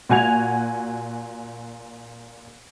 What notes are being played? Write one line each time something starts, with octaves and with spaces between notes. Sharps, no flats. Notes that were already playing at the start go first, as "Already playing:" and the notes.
A#2 F#4 G#5 G#6 F7